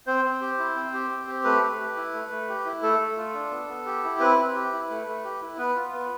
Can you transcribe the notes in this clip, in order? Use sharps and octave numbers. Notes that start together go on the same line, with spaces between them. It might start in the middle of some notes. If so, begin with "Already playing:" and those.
C4 C5
C4
G4
E4
C4
G4
C4
G4
A3 B4
A3
G4
E4
A3
A3
G4
E4
A3 A4
A3
F4
D4
B3
B3
G4
E4
C4 B4
C4
G4
E4
A3
A3
G4
E4
B3 B4
F4
B3